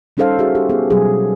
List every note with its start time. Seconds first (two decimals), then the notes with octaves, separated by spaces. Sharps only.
0.17 G3 C#4 D#4 A4 C5 F5
0.39 F#4 G#4 E5
0.55 G4
0.69 B3 G#4
0.90 B2 F#3 G3 G#4